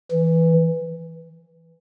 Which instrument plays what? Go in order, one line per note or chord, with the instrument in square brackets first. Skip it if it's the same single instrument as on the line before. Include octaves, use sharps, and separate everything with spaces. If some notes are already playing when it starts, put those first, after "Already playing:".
[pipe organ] E3